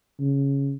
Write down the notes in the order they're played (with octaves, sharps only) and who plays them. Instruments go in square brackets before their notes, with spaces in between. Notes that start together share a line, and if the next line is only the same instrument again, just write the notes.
[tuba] C#3